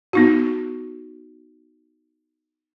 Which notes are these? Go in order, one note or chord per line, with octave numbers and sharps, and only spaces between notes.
B3 D#4 F#4